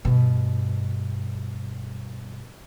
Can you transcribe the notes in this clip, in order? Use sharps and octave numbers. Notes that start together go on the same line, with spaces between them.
G2 B2